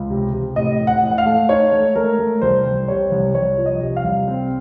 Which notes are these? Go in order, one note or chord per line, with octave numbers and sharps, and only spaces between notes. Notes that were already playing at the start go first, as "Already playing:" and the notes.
Already playing: C#2
C3
C3
A2 D#5
A2
F#5
A2
F#5
F5
A3
D#4 C#5
A3
A3 A#4
A3
C2 C5
C2
C3 C#5
C2
C2 C#5
F3
D#5
C3
F5
C2
C4